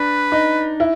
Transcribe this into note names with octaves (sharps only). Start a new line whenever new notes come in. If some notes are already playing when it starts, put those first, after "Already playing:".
Already playing: D4 B4
D#4
E4